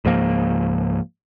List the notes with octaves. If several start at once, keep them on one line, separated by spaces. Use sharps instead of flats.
C#2 G#2 F3 A#3